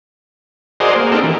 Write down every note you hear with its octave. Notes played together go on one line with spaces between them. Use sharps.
F#4 G#4 A#4 C5 D5 D#5
A#3
C4 D4 D#4 G4 A4 A#4
E3